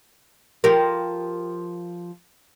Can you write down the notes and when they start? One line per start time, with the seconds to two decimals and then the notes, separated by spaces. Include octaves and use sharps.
0.64 F3 G4 A#4